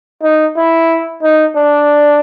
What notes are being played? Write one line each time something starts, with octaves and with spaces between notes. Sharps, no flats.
D#4
E4
D#4
D4